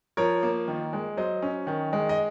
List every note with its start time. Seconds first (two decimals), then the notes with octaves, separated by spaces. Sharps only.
0.17 F3 A#4 C#5
0.43 A#3
0.68 D#3
0.93 G#3
1.17 F#3 C5 D#5
1.42 C#4
1.67 D#3
1.93 G#3
2.09 D#5